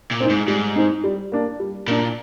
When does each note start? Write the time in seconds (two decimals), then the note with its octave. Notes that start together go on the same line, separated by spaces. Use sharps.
0.11 A#2
0.20 C4 D#4
0.29 G#2
0.48 G#2 G3
0.76 C4 D#4
1.04 G3
1.32 A#3 D4
1.60 G3
1.87 A#2 A#3 D4